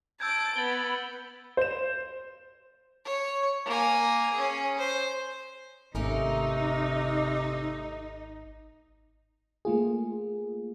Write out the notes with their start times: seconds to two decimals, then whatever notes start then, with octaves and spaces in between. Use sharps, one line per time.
0.20 A5 E6 G6 G#6 D7
0.56 B3 A6 F#7 G7
1.57 C5 E7
3.05 C#5
3.66 A#3 G#5
4.33 C#4 G#4
4.78 C5
5.95 G#1 C3 A3 C#4 D#4 A#4
9.65 A3 A#3 F4 G#4